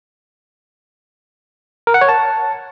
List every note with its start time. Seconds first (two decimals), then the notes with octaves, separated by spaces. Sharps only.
1.87 A#4
1.94 F#5
2.01 C#5
2.09 A5